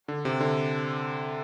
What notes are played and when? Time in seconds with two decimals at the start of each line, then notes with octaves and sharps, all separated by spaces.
0.08 D3
0.25 C3
0.40 D3